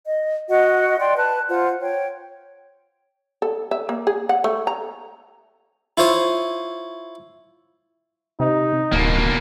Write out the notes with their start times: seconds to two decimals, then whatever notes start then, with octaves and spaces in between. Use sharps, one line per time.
0.05 D#5
0.49 F#4 D#5 F#5
0.99 D5 G5 C6
1.16 B4 A5 F#6
1.48 F4 C5 F#5
1.80 C#5 G5
3.42 A4
3.71 E5
3.89 A#3
4.07 G#4
4.29 F#5
4.44 A3
4.67 A#5
5.97 E4 F4 C5 C#5 D#6
8.40 C3 D#4
8.92 D1 B2 A#3